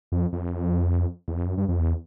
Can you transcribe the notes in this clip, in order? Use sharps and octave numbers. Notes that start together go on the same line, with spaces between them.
F2
F2
E2
F2
F#2
G2
F2
E2